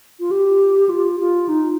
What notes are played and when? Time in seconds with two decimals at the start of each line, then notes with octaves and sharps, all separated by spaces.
0.20 F4
0.31 G4
0.89 F4
1.20 F4
1.48 D#4